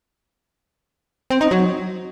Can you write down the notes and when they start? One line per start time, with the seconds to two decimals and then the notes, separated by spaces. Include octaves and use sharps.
1.30 C4
1.41 D#4
1.51 F#3